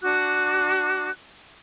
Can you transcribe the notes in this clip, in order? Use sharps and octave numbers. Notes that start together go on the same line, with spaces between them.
D4 F#4 D6 F#6